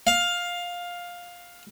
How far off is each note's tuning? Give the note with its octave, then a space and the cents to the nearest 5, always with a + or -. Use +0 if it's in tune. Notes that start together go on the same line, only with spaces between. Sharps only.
F5 +10